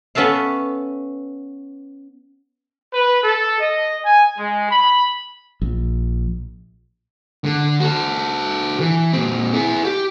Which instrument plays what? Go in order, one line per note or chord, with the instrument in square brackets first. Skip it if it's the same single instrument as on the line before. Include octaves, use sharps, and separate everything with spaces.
[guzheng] B3 C#4 A4 E5 F5
[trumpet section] B4
A4
D#5
G#5
G#3
B5
[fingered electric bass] A#1
[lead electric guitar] D3
F#4 A4
E3
A#2 C4
E4 G#4
G4